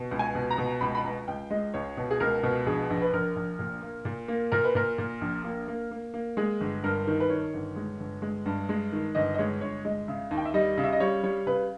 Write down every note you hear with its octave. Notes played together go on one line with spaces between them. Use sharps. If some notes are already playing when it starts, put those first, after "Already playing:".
Already playing: B2
C#2
G#5
B2
A#5
B2
C#2 B5
B5
C#2 A#5
C#2 G5
G#3 D#5
C#2 C#5
B2
G#4
C#2 A#4
B2
A#1 G#4
A#1
B4
A#1 A#4
A#1
A#2
A#3
A#2
A#3
A#2 A#4
B4
A#2 A#4
A#2
A#1
A#3
A#3
A#3
A#3
G#3 G#4
G1
G2 A#4
D#3
B4
D#3 C#5
G1
G#3
G1
G#3
G2
G#3
D#3
G1 D#5
D#5
G#3 C#5
G1 C#5
G#3 D#5
C#3 E5
D#2
G5
E5
G3 D#5
C#3
E5
D#5
G3 C#5
G3 C#5
C#3 B4